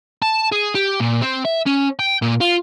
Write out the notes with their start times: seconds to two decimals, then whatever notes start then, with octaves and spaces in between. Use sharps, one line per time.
0.22 A5
0.52 G#4
0.75 G4
1.00 A#2
1.21 C4
1.45 E5
1.66 C#4
1.99 G5
2.22 A#2
2.41 F4